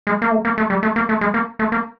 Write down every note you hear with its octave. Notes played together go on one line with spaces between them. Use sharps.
G#3
A#3
A3
A#3
A3
G3
A3
A#3
A3
G#3
A#3
A3
A#3